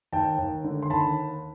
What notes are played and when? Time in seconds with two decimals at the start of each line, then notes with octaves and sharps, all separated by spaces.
0.12 D#2 G5 A5
0.39 D#2
0.64 D3
0.83 C6
0.90 D#2 A5 B5